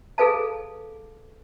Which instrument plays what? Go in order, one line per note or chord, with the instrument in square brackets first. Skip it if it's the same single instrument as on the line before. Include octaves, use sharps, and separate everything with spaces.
[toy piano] G#4 A4 B4 F5 A5